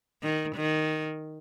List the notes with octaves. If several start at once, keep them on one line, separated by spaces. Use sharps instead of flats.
D#3
D#3